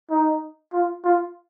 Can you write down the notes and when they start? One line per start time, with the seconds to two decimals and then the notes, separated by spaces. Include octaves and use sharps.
0.10 D#4
0.73 F4
1.04 F4